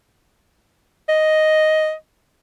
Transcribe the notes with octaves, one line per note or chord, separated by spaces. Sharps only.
D#5